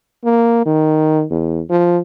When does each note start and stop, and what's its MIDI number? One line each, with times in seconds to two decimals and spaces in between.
0.25 0.62 58
0.66 1.24 51
1.31 1.61 40
1.70 1.99 53